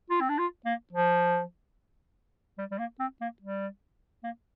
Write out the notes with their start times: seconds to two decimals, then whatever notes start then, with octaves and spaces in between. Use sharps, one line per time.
0.10 F4
0.21 C4
0.29 D4
0.38 F4
0.65 A#3
0.92 F3
2.58 G3
2.71 G3
2.79 A#3
3.00 C4
3.21 A#3
3.42 G3
4.24 A#3